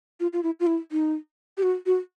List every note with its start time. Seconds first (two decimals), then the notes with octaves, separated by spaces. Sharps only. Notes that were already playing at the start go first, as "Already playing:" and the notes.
0.20 F4
0.33 F4
0.43 E4
0.60 F4
0.67 E4
0.92 D#4
1.57 G4
1.63 F#4
1.86 F#4